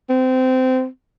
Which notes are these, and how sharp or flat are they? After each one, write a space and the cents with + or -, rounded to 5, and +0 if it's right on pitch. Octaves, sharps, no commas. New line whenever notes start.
C4 -20